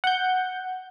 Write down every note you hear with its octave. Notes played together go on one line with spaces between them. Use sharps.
F#5 G6